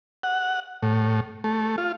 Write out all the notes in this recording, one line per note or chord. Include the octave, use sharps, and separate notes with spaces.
F#5
A2
A3
F4